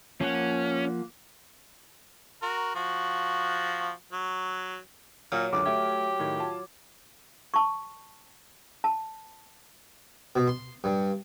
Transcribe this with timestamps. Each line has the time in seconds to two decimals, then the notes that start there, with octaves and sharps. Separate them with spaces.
0.21 F3 A#3 C#4 F#5
2.43 F#4 A#4
2.75 F3 F#4
4.12 F#3
5.32 A#2 F#3 F6
5.52 C#2 F#2 D3 D6
5.66 A3 G4 E5 G#6
6.19 A2 D#3 G#6
6.39 F4 A5
7.54 A5 C#6
8.84 A5
10.36 B2
10.47 C6
10.84 G2